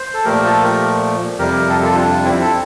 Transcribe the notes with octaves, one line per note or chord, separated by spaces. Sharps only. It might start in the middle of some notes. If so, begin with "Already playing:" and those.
Already playing: C5
A4
A#2 F3 A3 G4 A#4
F4 A4
G4 A#4
F2 C3 G3 G4 A#4
A4
G4
F4 A4
D4 F4
C4 E4
A4